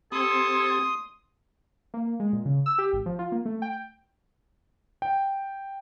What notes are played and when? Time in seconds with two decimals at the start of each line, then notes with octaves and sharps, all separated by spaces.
0.12 C4 G4 A4 C6 D#6 G#6
1.94 A#3
2.20 G#3
2.33 A#2
2.45 C#3
2.66 E6
2.78 G4
2.93 G#1
3.06 F3
3.19 F4
3.32 A#3
3.45 A3
3.62 G5
5.02 G5